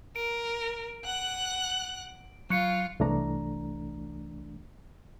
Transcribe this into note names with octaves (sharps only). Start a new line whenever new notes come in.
A#4 D7
F#5 F#6
F#3 F4 C#7
C2 E3 A3 D4 A#5